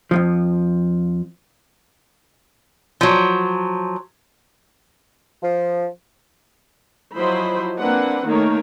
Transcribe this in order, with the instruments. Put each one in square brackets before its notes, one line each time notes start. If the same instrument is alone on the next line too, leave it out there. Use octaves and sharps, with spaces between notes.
[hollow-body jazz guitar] F2 G#2 F3
[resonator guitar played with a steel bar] F3 F#3
[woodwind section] F3
[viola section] F3 F#3 E4 C5 D#5 B5
A#3 C4 D4 B4 F#5
D#3 A3 A#3 D#4 A#4 C#5